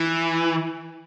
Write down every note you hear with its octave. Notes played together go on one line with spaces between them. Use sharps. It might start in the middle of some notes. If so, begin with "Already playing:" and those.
Already playing: E3